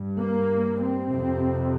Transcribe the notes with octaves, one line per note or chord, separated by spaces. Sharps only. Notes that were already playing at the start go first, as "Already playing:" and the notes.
Already playing: G2
A#3
C4
F2 C3